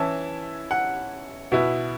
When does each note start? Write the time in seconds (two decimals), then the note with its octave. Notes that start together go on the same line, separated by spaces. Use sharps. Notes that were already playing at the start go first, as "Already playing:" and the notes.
Already playing: E3 C#4 E4 A5
0.71 F#5
1.52 B2 B3 E4